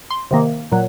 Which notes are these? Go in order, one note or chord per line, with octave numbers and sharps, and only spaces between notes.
C6
C3 D#3 A#3
A#2 F#3